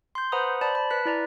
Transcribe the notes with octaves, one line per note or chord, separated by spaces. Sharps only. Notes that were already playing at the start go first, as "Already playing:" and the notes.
C6 G6
B4 C5 F#5 A#5 B5 D#6
C5 D5 A5 B5
A5 B5
B4 F#6 B6
E4 D5 A#5